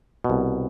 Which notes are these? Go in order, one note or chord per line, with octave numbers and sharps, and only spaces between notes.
B2
C2